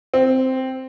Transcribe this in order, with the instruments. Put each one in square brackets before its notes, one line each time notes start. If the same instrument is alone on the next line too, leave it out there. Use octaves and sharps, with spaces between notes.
[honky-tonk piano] C4